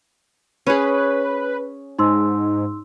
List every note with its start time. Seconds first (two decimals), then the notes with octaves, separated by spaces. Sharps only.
0.67 C#4 G#4 B4
1.99 G#2 D#4 C6 E6